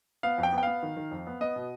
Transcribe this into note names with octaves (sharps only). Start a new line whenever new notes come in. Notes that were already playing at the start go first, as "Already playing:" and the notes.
B3 F5
F2
G5
B3
G5
B3 F5
D#3
D#3
F2
B3
B3 D#5
B2